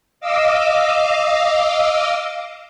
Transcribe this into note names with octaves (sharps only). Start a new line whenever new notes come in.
D#5 F5 D6 E6